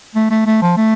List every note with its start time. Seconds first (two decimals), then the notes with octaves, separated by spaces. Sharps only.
0.15 A3
0.31 A3
0.46 A3
0.62 F3
0.77 A3